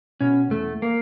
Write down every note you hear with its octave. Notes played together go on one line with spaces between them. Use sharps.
B2 C#4
E2 A3
A#3